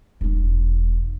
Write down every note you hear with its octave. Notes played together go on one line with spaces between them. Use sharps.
E1 D#4